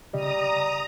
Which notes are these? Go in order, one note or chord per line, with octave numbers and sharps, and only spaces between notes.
C#3 G3 D#5 A#5 D#6